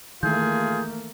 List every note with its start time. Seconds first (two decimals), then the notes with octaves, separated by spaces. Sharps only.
0.23 D#3 E3 A3 A#3 F4 G#4 G6